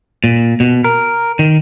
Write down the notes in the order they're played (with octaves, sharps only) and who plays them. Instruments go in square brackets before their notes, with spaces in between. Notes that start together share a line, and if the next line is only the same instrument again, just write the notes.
[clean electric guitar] A#2
B2
A#4
D#3